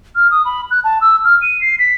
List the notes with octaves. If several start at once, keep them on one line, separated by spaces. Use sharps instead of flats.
F6
D#6
B5
F#6
A5
E6
F6
D#7
C7
B6